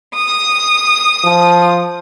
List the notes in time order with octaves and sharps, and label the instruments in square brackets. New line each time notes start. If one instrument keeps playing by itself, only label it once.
[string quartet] D#6
[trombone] F3